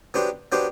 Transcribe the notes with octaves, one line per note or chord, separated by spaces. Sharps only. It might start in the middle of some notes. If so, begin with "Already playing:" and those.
F#3 B3 D4 G4 C5
F#3 B3 D4 G4 C5